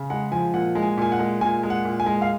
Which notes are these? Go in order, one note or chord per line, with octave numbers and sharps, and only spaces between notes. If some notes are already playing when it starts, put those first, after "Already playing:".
Already playing: C#3
G#3 F#5
F3 G#5
A#2 F#5
G#3
G#5
A#2 G#5
F#5
G#3
A#2 G#5
G#3
F#5
A#2
G#5
G#3
F5